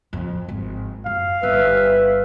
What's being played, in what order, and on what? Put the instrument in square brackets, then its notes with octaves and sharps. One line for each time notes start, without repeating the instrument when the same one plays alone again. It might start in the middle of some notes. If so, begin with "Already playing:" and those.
[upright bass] F2 D#3
G#1
[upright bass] F#2 [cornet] F5
[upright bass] G1 [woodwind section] B4 E5